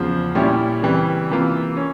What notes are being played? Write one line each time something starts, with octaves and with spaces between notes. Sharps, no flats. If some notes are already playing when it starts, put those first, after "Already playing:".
Already playing: E2 C#3 F3
A#2 G3 C#4 E4 G4
C#3 E3 G3 C4
C3 E3 A#3 F4
C#4